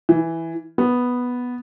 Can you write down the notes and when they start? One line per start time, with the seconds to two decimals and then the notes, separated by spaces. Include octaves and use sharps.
0.09 E3
0.78 B3